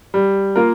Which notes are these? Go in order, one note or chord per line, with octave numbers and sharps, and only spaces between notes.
G3
A#3 F4 A#4